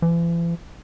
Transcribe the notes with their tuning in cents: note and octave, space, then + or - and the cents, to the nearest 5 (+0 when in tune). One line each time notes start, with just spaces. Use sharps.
E3 +45